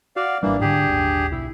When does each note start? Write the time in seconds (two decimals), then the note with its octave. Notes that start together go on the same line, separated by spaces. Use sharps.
0.16 F#4 D5 F5
0.43 G#1 E3 G3 A#3 D4
0.61 G#2 D3 D4 G4 G#4
0.88 D#1 G#1
1.32 B1 E4